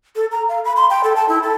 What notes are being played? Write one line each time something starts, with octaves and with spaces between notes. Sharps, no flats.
A4
A#5
F5
B5
C6
G5
A4
A5
E4
A4